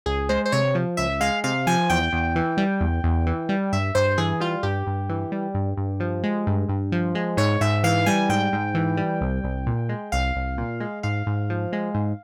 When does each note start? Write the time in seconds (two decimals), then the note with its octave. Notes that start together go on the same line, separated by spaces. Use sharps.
0.06 C#2 G#4
0.29 G#3 C5
0.46 C5
0.52 C3 C#5
0.75 F3
0.97 C#2 E5
1.21 G#3 F5
1.44 C3 F5
1.67 F3 G#5
1.90 E2 G5
2.13 E2
2.36 E3
2.57 G3
2.81 E2
3.04 E2
3.26 E3
3.49 G3
3.73 G2 E5
3.95 G2 C5
4.18 E3 G#4
4.40 G3 F4
4.63 G2 G4
4.87 G2
5.09 E3
5.32 G3
5.54 G2
5.77 G2
6.00 F3
6.24 G#3
6.47 G2
6.69 G2
6.92 F3
7.15 G#3
7.37 G#2 C#5
7.61 G#2 E5
7.84 E3 F5
8.06 G3 G#5
8.29 G#2 G5
8.53 G#2
8.74 E3
8.97 G3
9.21 C2
9.44 C2
9.67 A#2
9.89 G#3
10.12 C2 F5
10.36 C2
10.58 A#2
10.80 G#3
11.03 G#2 F5
11.26 G#2
11.50 F3
11.73 G#3
11.94 G#2